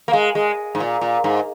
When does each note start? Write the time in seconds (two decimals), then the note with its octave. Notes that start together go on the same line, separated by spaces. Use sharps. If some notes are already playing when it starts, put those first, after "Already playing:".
0.08 A#3
0.13 G#3
0.35 G#3
0.75 G#2
0.80 A#2
1.01 A#2
1.24 G#2